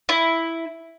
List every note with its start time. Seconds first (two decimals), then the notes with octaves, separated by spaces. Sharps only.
0.09 E4